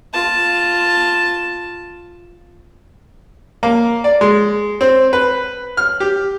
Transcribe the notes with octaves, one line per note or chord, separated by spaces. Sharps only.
F4 A5
A#3
D5
G#3
C4
B4
F6
G4